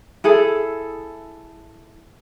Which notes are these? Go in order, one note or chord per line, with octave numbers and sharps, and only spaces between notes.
E4 G#4 A4